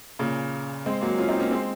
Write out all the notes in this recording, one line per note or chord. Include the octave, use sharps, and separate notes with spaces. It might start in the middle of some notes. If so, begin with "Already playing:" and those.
A#2 C#3
G#3 C4
F#3 A#3
C#4 F4
C4 D#4
A#3 C#4
G#3 C4